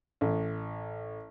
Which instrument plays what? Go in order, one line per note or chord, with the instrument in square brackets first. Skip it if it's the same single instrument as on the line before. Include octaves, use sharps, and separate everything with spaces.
[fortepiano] A1